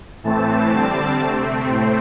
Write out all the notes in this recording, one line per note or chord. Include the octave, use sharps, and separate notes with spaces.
A2 E3 A3 C4 A5
D3 G3 C4
C3 A3 C4
A2 A3 C4 C5